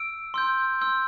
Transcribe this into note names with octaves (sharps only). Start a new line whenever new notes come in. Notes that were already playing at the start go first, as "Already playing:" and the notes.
Already playing: E6 D7
C6 E6 G6
C6 E6 G6